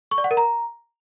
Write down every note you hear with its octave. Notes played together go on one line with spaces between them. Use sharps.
C#6
D5
F#5
A#4
A#5